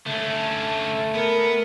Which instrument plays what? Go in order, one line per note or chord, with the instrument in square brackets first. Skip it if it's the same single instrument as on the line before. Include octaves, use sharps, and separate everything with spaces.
[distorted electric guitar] D3 C#4 [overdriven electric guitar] A3
[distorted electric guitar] B3 [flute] A#4